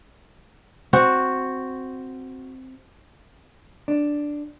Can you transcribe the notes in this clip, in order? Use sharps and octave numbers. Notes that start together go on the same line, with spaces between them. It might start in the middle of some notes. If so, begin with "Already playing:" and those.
C4 F#4
D4